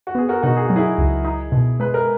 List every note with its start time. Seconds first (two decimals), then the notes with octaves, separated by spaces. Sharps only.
0.07 F#4
0.15 B3 G#4
0.29 F#4 A#4
0.43 B2 D#4 F#4
0.57 G#4
0.66 F#3 F#4
0.76 E4 G#4
0.98 C#2
1.25 D#4
1.52 B2
1.80 G#3 B4
1.94 A#4